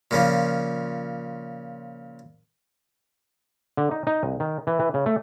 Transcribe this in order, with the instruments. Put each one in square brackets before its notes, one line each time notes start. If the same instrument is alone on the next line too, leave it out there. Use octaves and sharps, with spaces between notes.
[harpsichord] A#2 C#3 F3
[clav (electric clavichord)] D3
D#4
D#4
C2
D#3
E3
E3
C#3
A3